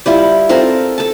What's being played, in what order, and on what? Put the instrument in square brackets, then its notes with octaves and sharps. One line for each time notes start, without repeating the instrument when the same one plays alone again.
[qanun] G3 E4 F4
C4 F4 A4 A#4
A4 A5